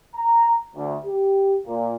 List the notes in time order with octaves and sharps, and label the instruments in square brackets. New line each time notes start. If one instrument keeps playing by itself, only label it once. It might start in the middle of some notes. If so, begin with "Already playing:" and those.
[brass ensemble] A#5
D2
G4
A#2